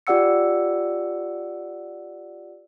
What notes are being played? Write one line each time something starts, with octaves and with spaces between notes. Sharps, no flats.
F4 G4 D5 F#5 E6 C#7